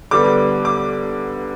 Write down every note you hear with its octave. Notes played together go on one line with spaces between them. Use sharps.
D3 G3 B3 D6
D6